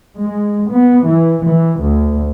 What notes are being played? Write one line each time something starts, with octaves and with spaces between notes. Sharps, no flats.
G#3
B3
E3
E3
D2